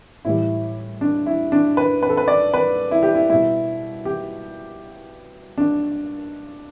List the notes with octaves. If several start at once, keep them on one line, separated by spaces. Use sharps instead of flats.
A2 E3 G3 E4
D4
E4
D4
B4
B4
A4
B4
D5
B4
E4
G4
E4
B2 G3 E4
G4
D4